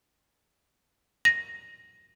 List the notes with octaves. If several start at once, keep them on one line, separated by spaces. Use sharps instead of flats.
A#6